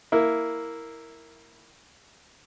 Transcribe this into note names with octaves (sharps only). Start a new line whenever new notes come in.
A#3 E4